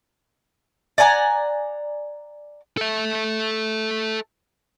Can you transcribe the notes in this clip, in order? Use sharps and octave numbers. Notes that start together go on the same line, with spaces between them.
D5 F#5 G#5 A#5
A4 E5